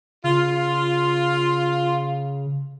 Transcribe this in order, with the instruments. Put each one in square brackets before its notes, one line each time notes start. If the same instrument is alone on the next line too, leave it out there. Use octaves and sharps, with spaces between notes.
[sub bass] C#3 [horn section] F4